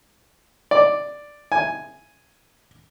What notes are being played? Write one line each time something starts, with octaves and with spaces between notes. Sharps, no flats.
D5
G#5